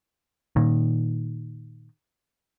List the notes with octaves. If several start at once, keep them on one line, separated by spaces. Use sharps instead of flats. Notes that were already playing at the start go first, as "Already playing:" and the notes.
A#2 D#3